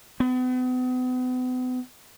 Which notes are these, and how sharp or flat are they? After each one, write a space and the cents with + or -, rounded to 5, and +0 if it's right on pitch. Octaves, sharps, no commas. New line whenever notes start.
B3 +40